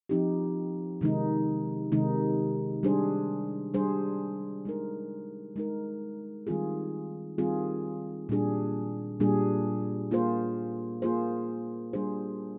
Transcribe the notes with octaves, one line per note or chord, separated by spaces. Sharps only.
F3 C4 D#4 G4
C3 D#3 G#3 D#4
C3 D#3 G#3 D#4
G3 D4 G#4 C5
G3 D4 G#4 C5
G#3 D#4 A#4
G#3 D#4 A#4
D#3 G3 C4 F4 G#4
D#3 G3 C4 F4 G#4
A#2 G3 D4 G#4
A#2 G3 D4 G#4
A#3 F4 G#4 C5
A#3 F4 G#4 C5
G3 D4 G#4 C5